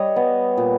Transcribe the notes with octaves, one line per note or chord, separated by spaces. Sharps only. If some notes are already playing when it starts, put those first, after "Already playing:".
Already playing: G3 C#5 D#5
B3
A#2